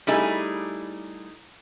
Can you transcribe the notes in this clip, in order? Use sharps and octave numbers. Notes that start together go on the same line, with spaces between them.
G3 A3 D#4 E4 G#4